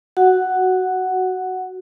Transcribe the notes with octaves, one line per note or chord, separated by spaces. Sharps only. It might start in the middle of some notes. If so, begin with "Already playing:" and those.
F#4 F#5